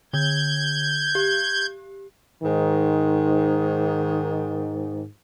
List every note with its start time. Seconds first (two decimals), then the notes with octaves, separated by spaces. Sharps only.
0.13 D3 G6 G#6 G7
1.15 G4
2.43 G#2 D#3